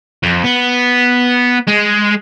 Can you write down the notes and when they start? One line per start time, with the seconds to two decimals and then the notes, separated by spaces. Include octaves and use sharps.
0.23 F2
0.44 B3
1.67 G#3